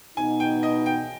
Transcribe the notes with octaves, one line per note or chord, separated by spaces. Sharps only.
B2 B3 D#4 G#5
G5
D#5
G5